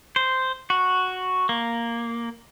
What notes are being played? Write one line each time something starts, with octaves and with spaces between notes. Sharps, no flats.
C5
F#4
A#3